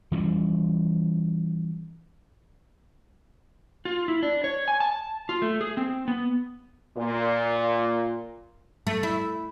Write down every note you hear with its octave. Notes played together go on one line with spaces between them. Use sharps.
E3 F3 G3 C#4
F4
E4
D4
C#5
G#5
A5
F4
A3
G#4
C4
B3
A#2
A3
E4